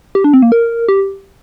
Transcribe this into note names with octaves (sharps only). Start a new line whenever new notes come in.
G4
D4
C4
A#3
A#4
G4